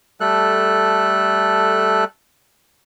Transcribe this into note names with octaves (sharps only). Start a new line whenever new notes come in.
G3 A3 A4 F#6